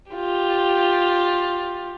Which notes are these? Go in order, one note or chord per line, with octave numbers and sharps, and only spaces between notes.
F4 G4